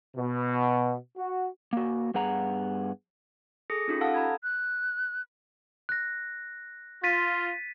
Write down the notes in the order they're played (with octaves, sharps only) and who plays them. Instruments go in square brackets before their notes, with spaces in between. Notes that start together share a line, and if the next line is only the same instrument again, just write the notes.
[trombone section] B2
F#4
[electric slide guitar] A#3 F#4
G2 B3 G#4 F#5 A#5
[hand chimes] G#4 A4 D#6 A#6 C#7
C#4 D#4 F4 G4
A4 F5 F#5 A5 E6
A#5 B5 G#6
[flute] F#6
[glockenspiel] F#6 A#6
[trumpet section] F4 [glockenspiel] A6 B6 D#7